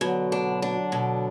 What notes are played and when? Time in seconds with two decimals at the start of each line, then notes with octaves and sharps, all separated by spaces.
0.01 B2 D3 F#3
0.32 D4
0.62 D4
0.92 B2